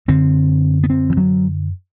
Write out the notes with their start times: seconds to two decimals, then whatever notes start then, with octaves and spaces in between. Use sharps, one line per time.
0.08 F#2 D3 C4
0.83 B3
0.90 C4
1.10 E3
1.17 F#3